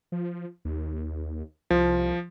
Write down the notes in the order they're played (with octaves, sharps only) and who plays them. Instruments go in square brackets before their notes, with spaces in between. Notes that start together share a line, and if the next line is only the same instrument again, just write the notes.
[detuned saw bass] F3
D#2
[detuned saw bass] C2 [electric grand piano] F3